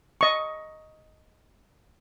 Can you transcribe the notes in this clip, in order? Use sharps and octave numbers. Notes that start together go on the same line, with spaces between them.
D#5 C#6